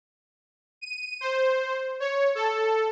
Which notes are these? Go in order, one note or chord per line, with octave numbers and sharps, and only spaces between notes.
D#7
C5
C#5
A4